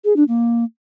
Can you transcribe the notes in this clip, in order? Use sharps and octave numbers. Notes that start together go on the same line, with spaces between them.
G#4
D4
A#3